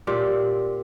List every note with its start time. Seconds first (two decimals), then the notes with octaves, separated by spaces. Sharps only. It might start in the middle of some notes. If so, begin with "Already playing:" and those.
0.07 A#2 C4 G4 D5